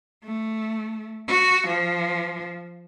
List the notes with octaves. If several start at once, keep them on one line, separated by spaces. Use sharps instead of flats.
A3
F#4
F3